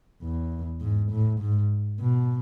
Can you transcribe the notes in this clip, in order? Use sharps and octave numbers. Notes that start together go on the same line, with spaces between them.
E2
G#2
A2
G#2
B2